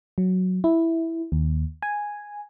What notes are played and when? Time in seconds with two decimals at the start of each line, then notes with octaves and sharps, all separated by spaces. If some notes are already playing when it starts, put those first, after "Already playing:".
0.18 F#3
0.64 E4
1.32 D#2
1.82 G#5